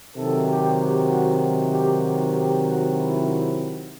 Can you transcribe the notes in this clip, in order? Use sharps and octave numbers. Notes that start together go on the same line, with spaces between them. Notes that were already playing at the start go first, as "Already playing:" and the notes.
C3 D#3 F#3 A4
G4
G4
F#4
G4
F#4
G4
F#4
E4